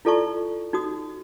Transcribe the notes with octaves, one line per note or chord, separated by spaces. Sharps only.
E4 F4 A4 D5 A5 C#6
D#4 F#4 D#6